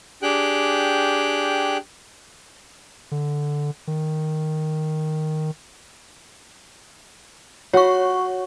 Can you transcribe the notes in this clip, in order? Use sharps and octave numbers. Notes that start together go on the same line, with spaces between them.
D4 G4 G#4 G5 F#6
D3
D#3
F#4 C#5 C#6